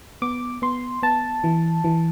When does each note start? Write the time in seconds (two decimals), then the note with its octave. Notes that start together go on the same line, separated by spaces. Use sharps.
0.22 B3 D6
0.62 B3 C6
1.03 B3 A5
1.44 E3
1.84 E3